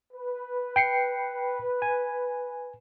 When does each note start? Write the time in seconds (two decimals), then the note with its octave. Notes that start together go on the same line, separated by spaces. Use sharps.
0.13 B4
0.76 G5 C7 C#7
1.82 G#5